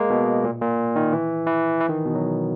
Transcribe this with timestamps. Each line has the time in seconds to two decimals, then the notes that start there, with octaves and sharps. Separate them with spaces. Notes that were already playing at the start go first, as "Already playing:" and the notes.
Already playing: G#3 A#3
0.10 B2
0.44 A#2
0.61 A#2
0.96 D#3
1.13 E3
1.46 E3
1.80 E3
1.89 D#3
2.06 B2
2.15 F#3